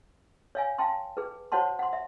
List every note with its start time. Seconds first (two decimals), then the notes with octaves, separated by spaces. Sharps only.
0.55 C#5 F5 G#5
0.78 F5 G5 A5 C6
1.17 G#4 B4
1.52 F#4 C5 C#5 F#5 A5 C6
1.79 F#5 C6
1.93 E5